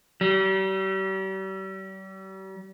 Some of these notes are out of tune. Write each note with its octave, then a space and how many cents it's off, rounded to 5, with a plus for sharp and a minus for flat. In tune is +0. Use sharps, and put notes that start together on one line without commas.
G3 -40